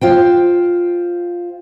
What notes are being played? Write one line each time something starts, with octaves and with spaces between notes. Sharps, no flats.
F4 C5 G5